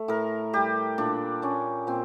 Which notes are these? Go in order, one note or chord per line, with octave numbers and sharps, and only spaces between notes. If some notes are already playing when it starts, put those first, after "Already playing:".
Already playing: A3
A2 A#4
G3 G4
A#2 D4
A#2 C#4
A#2 C4